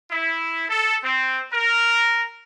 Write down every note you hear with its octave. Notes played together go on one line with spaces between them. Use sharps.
E4
A4
C4
A#4